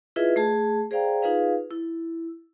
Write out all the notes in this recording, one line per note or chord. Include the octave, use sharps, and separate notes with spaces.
E4 F4 G#4 B4 D#5 E5
A3 G#4 A5
G#4 C5 D5 F5 G5 A#5
D#4 F4 G#4 B4 F5
E4